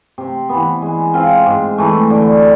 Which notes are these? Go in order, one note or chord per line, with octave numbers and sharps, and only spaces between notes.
C3
E3 B3
G#3
C4 F4
G#2
E3 A3
D3